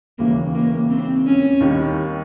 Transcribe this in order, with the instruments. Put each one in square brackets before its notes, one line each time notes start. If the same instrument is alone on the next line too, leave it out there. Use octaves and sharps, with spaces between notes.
[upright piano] E1 D#2 C#3 E3 [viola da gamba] A#3
[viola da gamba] A#3
C4
C#4
[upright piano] D#2 D#3 G3